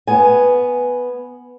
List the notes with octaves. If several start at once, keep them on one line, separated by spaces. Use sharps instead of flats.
B3 G#5